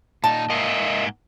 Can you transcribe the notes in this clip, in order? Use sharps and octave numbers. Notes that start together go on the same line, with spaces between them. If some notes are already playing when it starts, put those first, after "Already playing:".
A#2 D#4 A5
G#2 A#3 D#5 E5